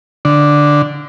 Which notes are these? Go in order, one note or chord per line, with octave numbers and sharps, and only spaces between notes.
D3